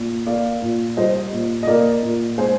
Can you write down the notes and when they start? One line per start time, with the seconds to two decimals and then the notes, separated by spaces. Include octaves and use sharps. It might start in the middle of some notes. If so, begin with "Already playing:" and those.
Already playing: A#2
0.26 A#3 D5 F5
0.62 A#2
0.97 G3 C5 D#5
1.33 A#2
1.63 D#5
1.67 A#3 A#4 D5
2.03 A#2
2.38 G#3 G#4 C5